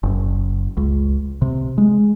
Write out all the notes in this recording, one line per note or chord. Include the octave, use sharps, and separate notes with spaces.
F#1
C#2
C3
G#3